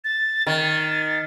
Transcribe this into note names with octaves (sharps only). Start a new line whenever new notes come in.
A6
D#3 A6